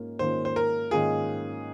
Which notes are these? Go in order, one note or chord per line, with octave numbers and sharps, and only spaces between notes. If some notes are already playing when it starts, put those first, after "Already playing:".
Already playing: G#2 A#3 C#4 F4
G#2 D#3 A#3 C#4 F4 C5
C5
A#4
G#2 D#3 A#3 C#4 F4 G#4